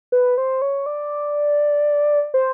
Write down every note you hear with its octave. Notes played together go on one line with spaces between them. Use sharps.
B4
C5
C#5
D5
C5